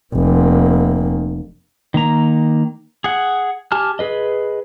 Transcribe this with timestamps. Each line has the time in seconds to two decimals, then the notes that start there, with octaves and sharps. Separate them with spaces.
0.14 F1 A#3
1.94 D#3 A#3 A#5
3.04 G#4 F#5
3.72 G4 G#5 A5 F6
3.99 G#4 B4 D#5